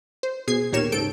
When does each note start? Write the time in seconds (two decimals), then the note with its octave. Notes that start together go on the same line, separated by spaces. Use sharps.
0.23 C5
0.48 B2 G#4 G#6 C7
0.72 D#2 A#2 G4 A#4 C#5 E7
0.92 C#2 G#2 A4 G6 D7